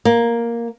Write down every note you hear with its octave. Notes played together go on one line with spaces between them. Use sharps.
A#3